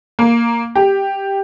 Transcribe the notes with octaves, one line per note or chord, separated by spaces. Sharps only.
A#3
G4